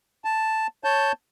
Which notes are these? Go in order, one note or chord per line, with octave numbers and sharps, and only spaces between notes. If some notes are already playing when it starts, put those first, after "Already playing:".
A5
C#5 A5 G6